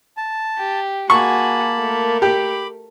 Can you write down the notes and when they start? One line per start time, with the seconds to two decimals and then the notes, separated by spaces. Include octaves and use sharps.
0.17 A5
0.58 G4
1.10 A#3 F#4 G#4 A5 B5 C#6
1.78 A3 A#4
2.22 G4 B5 D6